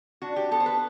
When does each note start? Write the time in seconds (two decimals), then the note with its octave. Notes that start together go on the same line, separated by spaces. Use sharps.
0.22 D4 F#4
0.36 G4
0.51 B3 A4
0.60 C5
0.66 B4